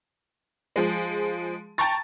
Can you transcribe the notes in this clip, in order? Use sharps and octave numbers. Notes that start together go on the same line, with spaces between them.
F3 G#3
G5 A5 A#5 C#6 A6